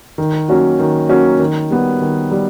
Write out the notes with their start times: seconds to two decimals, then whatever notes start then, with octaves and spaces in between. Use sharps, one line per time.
0.18 D#3
0.48 F#3 A#3 C#4 F#4
0.80 D#3
1.09 F#3 A#3 C#4 F#4
1.39 D#3
1.71 G3 B3
2.01 D#3
2.31 G3